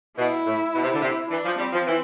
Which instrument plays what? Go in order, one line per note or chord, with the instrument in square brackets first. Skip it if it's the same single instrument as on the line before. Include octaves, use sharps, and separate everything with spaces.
[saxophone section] B2 [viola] E4
[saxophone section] A2
B2
C3
D3
[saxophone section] C3 [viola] E4
[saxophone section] E3 [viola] D4
[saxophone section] F3
[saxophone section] G3 [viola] C4
[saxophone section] F3
E3